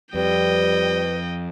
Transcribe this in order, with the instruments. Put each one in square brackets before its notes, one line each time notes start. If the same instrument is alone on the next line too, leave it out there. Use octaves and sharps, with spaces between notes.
[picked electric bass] F2 [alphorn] G3 [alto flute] B4 [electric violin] D#5 G5